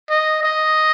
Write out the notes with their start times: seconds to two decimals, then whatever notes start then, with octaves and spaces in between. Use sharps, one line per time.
0.10 D#5
0.43 D#5